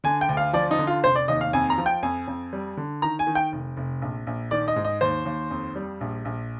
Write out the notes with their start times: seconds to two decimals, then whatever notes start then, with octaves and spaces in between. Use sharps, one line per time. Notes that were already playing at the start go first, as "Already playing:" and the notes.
0.04 D3 G#5
0.21 G5
0.29 D2
0.37 F5
0.53 F3 D5
0.71 D#4
0.79 D3
0.87 F4
1.04 F1 C5
1.15 D5
1.28 D#2 D#5
1.41 F5
1.53 F2 G#5
1.70 A#5
1.78 F3
1.86 G5
2.03 F2 G#5
2.28 F2
2.53 G3
2.77 D3
3.02 D#3 A#5
3.19 G#5
3.27 D#3
3.35 G5
3.52 F1
3.77 F1
4.02 A#1
4.27 A#1
4.51 D#3 D5
4.68 D#5
4.76 G#2
4.85 D#5
5.01 D#2 C5
5.26 D#2
5.51 F2
5.76 G3
6.01 A#1
6.25 A#1